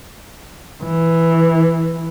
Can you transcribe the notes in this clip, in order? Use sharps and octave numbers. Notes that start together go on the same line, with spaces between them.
E3